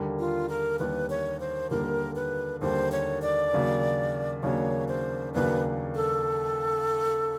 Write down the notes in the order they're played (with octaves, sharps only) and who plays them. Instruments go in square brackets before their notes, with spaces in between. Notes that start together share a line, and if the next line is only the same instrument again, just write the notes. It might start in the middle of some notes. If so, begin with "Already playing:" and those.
Already playing: [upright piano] D#2 D3 G3 A#3
[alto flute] F4
A#4
[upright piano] D#2 D3 G3 A#3 [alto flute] B4
[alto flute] C#5
C5
[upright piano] D#2 D3 G3 A#3 [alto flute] A#4
[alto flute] B4
[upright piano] D#2 D3 G3 A#3 [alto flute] C5
[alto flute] C#5
D5
[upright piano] D#2 C#3 F#3 A#3 D4
[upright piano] D#2 C#3 F#3 A#3 D4 [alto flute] C#5
[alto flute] C5
[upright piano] D#2 C#3 F#3 A#3 D4 [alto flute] B4
[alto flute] A4